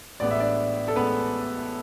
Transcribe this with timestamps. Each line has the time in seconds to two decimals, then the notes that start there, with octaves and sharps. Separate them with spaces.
0.20 A1 A2 G#3 B3 D5
0.31 E5
0.40 D4 D5
0.88 A4
0.96 A1 A2 G#3 B3 B4